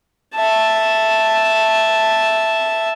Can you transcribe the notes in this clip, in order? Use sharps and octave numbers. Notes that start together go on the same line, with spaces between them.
E5 A5